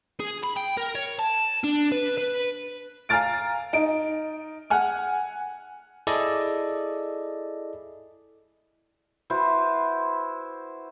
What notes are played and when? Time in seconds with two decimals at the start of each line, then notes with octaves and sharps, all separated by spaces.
0.20 G#4
0.43 B5
0.57 G5
0.77 A#4
0.95 C#5
1.19 A5
1.64 D4
1.92 B4
2.18 B4
3.09 F5 G#5 A#5 F6 A6 D7
3.73 D#4 D7
4.70 F#5 G#5 F6
6.07 E4 G#4 A4 D5 D#5
9.30 E4 F#4 B4 C5